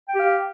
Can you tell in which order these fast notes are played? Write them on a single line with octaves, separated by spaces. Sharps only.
G5 G4 F5